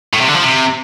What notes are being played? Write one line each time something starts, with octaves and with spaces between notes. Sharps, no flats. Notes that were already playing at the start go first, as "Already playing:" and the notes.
A2
C3
D3
F3
C3